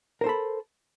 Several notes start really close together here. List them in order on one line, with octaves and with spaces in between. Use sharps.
A#4 C5 A4 B5